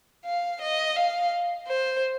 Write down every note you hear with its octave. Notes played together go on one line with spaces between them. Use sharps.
F5
D#5
F5
C5